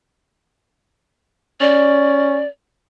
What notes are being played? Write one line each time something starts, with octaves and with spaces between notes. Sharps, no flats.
C#4 D5